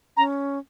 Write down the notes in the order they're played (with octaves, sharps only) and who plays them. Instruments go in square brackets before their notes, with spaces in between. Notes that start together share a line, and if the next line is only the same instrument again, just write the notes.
[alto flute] C#4 [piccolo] A#5